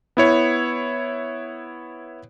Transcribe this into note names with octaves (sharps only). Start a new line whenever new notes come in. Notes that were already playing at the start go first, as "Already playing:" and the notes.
B3 E4 C#5